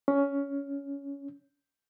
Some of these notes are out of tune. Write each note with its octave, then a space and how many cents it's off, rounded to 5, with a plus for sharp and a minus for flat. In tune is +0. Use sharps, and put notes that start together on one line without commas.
C#4 +15